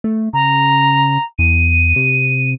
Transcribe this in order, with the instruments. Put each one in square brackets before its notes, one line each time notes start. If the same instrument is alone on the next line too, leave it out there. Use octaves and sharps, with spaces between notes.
[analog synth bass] A3
[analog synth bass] C#3 [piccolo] A#5
[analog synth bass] E2 [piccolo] D#7
[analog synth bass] C3